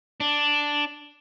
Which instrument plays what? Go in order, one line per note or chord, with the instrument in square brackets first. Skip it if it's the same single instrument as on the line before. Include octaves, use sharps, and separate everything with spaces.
[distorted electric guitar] D4